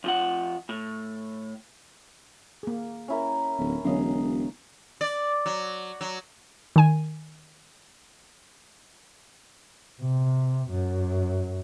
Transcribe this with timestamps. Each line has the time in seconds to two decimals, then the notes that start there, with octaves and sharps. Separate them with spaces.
0.04 F2 F3 F#5
0.69 A2
2.63 A#3 G#4
3.08 C#4 E4 A#4
3.58 D1
3.85 E1 D3 F#3 C#4 D#5 F5
5.01 D5
5.46 F#3
6.01 F#3
6.76 D#3 G#5
10.01 C3
10.71 F#2